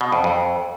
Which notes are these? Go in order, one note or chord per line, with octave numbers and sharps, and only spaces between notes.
B2
F2
F2